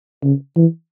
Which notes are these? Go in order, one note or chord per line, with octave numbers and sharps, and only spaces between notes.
C#3
E3